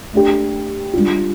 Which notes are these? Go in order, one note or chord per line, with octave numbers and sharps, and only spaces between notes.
A3 D4 G4
G3 D4 F4